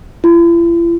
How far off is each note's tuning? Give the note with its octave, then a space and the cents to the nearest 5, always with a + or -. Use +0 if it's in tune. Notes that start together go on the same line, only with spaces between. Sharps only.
E4 +45